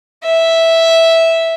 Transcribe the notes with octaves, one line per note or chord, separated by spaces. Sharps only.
E5